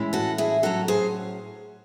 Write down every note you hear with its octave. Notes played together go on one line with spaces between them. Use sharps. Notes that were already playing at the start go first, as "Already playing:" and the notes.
Already playing: A2 E3 G#3 C#4 E4
F#4 A4
E4 G#4
A2 F#3 C#4 F#4 A4
G#4 C5